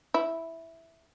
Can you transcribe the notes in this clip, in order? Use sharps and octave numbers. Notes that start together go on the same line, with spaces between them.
E4